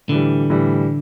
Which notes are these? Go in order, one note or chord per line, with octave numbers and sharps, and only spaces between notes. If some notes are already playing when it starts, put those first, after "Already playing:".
A2 D3 E3 G3
A2 E3 G3